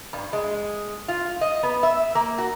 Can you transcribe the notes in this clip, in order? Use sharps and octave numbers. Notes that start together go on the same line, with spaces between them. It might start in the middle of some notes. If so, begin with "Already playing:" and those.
G2
G#3
F4
D#5
B3
E5
A#3
F#4